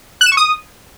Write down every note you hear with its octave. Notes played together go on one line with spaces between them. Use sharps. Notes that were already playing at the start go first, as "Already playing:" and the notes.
F#6
E7
C#6
D#6